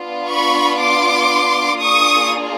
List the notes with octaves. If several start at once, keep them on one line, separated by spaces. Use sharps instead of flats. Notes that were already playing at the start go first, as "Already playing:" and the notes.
Already playing: B3 D4 F4
B5 C#6
C6 D6
A#3 D4 F4 G#4 C#6 D#6